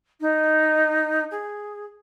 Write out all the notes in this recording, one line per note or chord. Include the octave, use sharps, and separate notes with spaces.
D#4
G#4